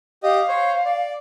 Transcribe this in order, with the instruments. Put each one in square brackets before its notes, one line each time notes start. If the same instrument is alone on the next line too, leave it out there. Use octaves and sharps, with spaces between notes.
[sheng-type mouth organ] G4 D#5 [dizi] F5
[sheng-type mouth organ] C5 C#5
D5